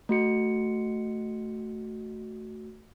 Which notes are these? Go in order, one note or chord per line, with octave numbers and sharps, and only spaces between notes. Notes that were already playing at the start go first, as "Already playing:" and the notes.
A3 F#4 C#7